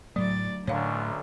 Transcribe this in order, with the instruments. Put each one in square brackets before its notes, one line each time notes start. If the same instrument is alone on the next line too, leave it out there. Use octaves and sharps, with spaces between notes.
[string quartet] D2 D5 A6 [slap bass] A2 A3 [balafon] F#3
[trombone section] B1 F#2 [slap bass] A2 [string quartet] D3 [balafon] C#5 F5